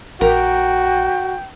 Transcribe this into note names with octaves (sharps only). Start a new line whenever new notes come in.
A#1 F#4 A#4 G5